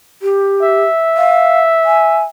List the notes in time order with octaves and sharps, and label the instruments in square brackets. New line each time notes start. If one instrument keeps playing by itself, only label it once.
[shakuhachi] G4
[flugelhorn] E5
[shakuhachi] F5
G#5